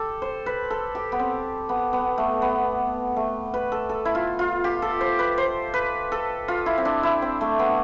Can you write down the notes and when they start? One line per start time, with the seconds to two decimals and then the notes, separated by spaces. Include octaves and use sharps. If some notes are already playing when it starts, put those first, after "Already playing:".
Already playing: G4 A4
0.22 C5
0.46 B4
0.70 A4
0.95 G4
1.12 B3
1.19 C4
1.69 B3
1.93 B3
2.18 A3
2.42 B3
3.16 A3
3.54 B4
3.72 A4
3.89 A4
4.05 E4
4.15 F4
4.39 F4
4.64 G4
4.82 A4
5.01 C5
5.19 B4
5.38 C5
5.74 B4
6.12 A4
6.48 F4
6.66 E4
6.78 C4
6.85 D4
7.03 E4
7.22 C4
7.41 A3
7.59 B3